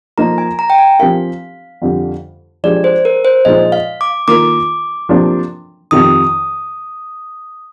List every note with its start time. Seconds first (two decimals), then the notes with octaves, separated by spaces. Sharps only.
0.18 F3 A#3 D#4 A#4 A#5
0.38 G#5
0.59 A#5
0.70 G5
0.78 G#5
0.99 F3 C4 G4 A#4 F5
1.82 F2 D3 G3
2.64 F3 G#3 D4 G4 D5
2.84 C5
3.05 A#4
3.25 C5
3.45 A#2 F3 G#3 D#4 D#5
3.72 F5
4.01 D6
4.28 D#3 A#3 F4 A#4 D6
5.09 C3 F3 A#3 D4
5.91 F2 C3 D#3 D#6